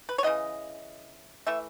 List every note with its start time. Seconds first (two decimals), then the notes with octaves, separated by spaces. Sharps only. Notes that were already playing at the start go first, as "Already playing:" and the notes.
0.09 B4
0.18 C#5
0.23 C#3 E3 B3 D#5
1.47 E3 A3 E5